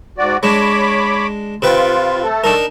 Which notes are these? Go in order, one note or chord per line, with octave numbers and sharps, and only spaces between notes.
G#2 F#4 D5
G#3 D4 C#5 B5 D6
C3 F4 B4 G5
A3 A4
D4 D#4 A#4